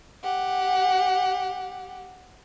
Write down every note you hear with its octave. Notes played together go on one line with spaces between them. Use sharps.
G4 F#5